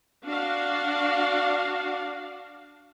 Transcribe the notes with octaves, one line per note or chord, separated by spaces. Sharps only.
D4 F#4 F5